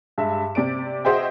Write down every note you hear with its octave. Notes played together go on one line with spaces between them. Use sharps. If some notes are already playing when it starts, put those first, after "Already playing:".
G2 G#3 E5
C3 G4 D5 D7
F#4 G#4 C5 D#5 E5 G5